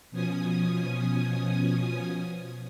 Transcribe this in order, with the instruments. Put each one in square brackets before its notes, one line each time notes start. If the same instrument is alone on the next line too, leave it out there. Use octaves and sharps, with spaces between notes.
[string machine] B2 F3 C#4 G#5 D#6